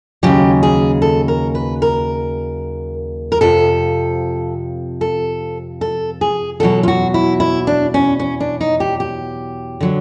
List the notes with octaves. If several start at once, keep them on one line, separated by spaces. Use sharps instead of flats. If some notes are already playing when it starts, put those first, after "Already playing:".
D#2 C#3 F#3 G4
G#4
A4
A#4
B4
A#4
A#4
F2 C3 F3 A4
A4
A4
G#4
E2 B2 F#3 A4
F4
F#4
E4
E4
D4
C#4
C#4
D4
D#4
G4
G4
D3 F#3